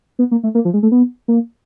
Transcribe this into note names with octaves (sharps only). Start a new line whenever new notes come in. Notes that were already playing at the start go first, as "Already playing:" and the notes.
B3
A#3
A3
A#3
F3
G#3
A3
B3
A#3